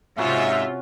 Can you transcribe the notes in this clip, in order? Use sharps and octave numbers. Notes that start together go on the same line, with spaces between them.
G#2 C3 C#4 F4 F#4 E5